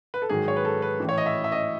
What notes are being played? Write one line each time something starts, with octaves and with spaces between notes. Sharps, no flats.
B4
A4
G#2 D#3 F#3 G#4
C#5
B4
A4
B4
A2 E3
C#5
D#5
E5
E5
D#5